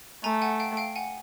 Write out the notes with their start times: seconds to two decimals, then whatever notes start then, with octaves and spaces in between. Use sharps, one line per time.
0.23 A3 G#5 A#5
0.42 F#5 G#5
0.60 F5 G5
0.77 F5 G5
0.96 F#5 G#5